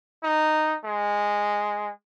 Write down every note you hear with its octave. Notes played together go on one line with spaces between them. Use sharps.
D#4
G#3